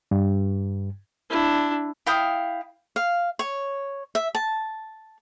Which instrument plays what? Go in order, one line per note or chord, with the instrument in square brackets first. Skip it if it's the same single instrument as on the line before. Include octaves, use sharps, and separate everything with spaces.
[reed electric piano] G2
[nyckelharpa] D4 E4
[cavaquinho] E4 F5 G5 D#6
F5
C#5
E5
A5